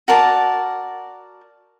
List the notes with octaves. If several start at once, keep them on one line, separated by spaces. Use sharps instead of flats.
F#4 A#4 D5 A5